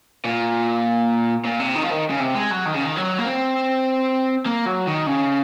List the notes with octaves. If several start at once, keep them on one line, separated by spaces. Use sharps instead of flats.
A#2
A#2
C3
D#3
F3
D#3
C#3
C3
G#3
F#3
D#3
C#3
D#3
F#3
A#3
C4
A#3
F#3
D#3
C#3